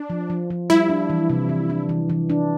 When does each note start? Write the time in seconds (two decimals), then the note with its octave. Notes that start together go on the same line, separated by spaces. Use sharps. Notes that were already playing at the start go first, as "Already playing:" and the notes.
Already playing: D4
0.10 F3
0.30 F3
0.50 F3
0.70 G3 E4
0.90 D4
1.10 E3
1.29 C3
1.49 E3
1.70 D4
1.89 E3
2.10 E3
2.30 D4